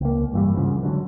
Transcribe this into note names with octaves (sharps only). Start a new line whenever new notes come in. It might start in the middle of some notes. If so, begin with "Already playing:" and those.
C#2 A#3
G2 E3 G3
G#2 C#3 F3
D3 F#3